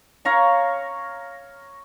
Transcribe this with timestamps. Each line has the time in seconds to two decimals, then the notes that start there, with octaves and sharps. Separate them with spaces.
0.25 C#5 F5 A#5 C#6